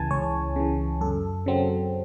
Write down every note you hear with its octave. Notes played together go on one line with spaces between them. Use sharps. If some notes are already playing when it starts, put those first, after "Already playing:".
Already playing: C#2 C#3 E3 G#5 A5
C#2 C#5
C#3 E3
F#2 A4
C#3 F#3 C4